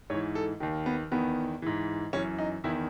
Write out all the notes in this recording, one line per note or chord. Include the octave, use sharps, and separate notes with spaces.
G#2 E3 C#5
A4
D#2 D#3
B3
E2 D#3 B3
G#2 E3
F#2 E3 C#4
D#4
E2 D#3 E4